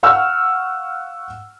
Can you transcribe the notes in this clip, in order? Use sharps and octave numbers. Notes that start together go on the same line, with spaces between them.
F5 F#5 C#6 E6 F6